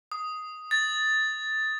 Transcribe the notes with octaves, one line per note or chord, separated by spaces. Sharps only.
D#6
A6